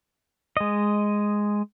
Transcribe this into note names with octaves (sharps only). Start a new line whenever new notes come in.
G#3 D#5